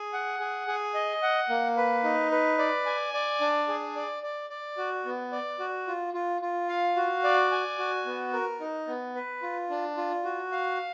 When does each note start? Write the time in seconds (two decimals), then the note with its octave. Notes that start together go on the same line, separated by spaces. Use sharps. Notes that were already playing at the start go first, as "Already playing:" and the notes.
Already playing: G#4
0.13 F#5
0.40 G#4
0.68 G#4
0.94 D#5
1.22 F#5
1.49 A#3
1.77 B4
2.04 D#4
2.31 B4
2.59 D5
2.86 G#5
3.13 D5
3.41 D4
3.68 G#4
3.96 D5
4.23 D5
4.50 D5
4.78 F#4
5.05 B3
5.32 D5
5.59 F#4
5.87 F4
6.14 F4
6.42 F4
6.69 F5
6.96 F#4
7.24 D5
7.51 G#5
7.78 F#4
8.06 B3
8.33 A#4
8.61 D#4
8.88 B3
9.15 B4
9.42 F4
9.70 D4
9.97 F4
10.25 F#4
10.52 F5